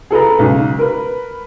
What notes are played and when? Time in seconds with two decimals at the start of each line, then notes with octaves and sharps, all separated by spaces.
0.10 G#4 A4 B4 A#5
0.39 B1 G#2 C#3
0.79 A#4 B4